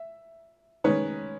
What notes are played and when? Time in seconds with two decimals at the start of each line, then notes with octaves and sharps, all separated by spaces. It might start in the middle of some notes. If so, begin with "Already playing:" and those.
Already playing: E5
0.84 D#3 G#3 C#4 B4 C#5